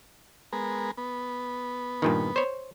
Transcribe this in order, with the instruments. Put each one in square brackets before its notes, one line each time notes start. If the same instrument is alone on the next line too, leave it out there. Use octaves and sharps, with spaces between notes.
[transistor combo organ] G#3 B3 A#4
B3
[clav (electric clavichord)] G2 A#2 D#3
C5 C#5